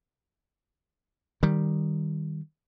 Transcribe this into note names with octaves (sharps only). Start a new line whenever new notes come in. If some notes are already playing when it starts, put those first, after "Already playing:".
D#3 G3